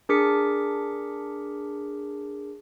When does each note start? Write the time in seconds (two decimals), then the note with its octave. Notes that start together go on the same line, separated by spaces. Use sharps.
0.09 D4 G#4 A#4 D6 B6 C#7